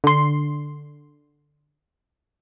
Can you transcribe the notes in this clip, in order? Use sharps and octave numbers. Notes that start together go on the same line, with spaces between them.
D3 C6